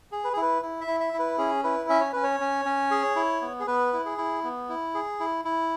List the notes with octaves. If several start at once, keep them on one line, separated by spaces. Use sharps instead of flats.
G#4
B4
G#4
E4 B4
E4
E5
E4
E5
E4
B4
C#4 G#4
E4 B4
C#4 E5
C#5
C#4 B4
C#5
C#4
C#4
G#4
E4
B3
G#4
B3 B4
E4
G#4
E4
B3
E4
G#4
E4
E4